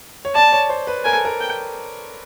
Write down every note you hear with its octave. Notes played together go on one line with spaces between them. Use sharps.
C#5
D5 A5
C#5
C5
B4
A#4 G#5
A4
A#4
G5